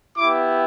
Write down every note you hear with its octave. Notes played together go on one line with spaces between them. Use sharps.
B3 E4 G4 D6